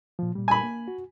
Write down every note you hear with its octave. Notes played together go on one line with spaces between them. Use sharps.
A#2 F3
A#2 G3
G#5 B5
A#3
F#4